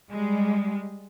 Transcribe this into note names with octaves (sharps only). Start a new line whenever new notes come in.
G3 G#3